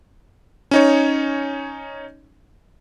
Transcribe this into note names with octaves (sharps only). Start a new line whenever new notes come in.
C#4 D#4 C#5